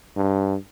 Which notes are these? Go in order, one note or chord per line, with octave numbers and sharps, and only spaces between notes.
G2